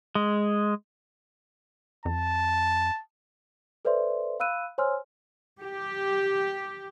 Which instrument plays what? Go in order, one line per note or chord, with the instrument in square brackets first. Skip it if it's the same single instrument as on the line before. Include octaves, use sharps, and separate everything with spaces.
[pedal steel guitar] G#3
[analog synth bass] F2 [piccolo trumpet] A5
[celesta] A4 B4 C5 D5 E5 C6
F5 B5 E6 F#6 D#7
C5 C#5 G#5 C6 E6 F6
[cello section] G4